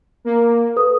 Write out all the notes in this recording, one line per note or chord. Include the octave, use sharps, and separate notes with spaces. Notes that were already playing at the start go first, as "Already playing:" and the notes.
A#3
A4 B4 D#6